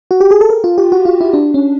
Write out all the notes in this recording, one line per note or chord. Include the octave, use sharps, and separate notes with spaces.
F#4
G4
G#4
A4
A#4
F4
G4
F#4
F4
E4
D4
C#4